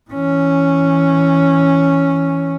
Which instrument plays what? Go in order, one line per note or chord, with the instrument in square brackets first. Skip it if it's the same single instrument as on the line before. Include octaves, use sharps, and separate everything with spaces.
[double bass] E3 C#4